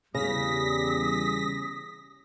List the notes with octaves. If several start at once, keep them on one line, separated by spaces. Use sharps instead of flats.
E2 C#3 G3 D#6 A#6 B6